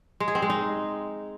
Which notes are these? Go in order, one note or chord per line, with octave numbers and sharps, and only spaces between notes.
G#3
G#4
C4
G#3
D#4